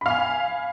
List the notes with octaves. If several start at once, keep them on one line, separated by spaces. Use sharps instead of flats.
F5 G#5 B5